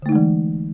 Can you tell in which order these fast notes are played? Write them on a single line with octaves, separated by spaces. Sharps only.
D3 A3 D#4 G#3 E3